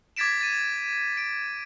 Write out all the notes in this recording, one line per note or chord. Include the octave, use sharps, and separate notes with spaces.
D6 G#6 A6 B6 D7 E7
A6 D#7
D7